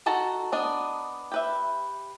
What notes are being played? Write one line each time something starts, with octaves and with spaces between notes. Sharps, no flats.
D#4 F#4 A4 A5 A#5
B3 D4 D#5
G4 B4 E5